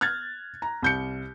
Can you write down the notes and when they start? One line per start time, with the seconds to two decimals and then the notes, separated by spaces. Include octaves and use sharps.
0.01 F6 F#6 G#6 A6
0.62 A#5
0.82 C2 G6 C#7